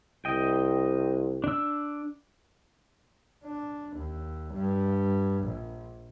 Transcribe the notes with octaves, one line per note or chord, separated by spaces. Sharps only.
C2 D#5 G5
D4 E6
D4
D#2
G2
A#1